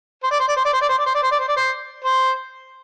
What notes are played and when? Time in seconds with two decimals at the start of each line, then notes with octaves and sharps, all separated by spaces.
0.23 C5
0.31 D5
0.40 C5
0.48 D5
0.56 C5
0.65 D5
0.73 C5
0.81 D5
0.89 C5
0.98 D5
1.06 C5
1.15 D5
1.23 C5
1.31 D5
1.40 C5
1.48 D5
1.56 C5
2.04 C5